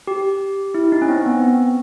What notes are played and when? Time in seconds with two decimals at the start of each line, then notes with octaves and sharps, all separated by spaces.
0.07 G4
0.74 E4
0.92 D#4
1.02 C#4
1.09 C4
1.22 C4
1.26 B3
1.42 C4